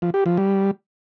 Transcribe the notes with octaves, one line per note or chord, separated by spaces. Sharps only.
F3
G4
F3
G3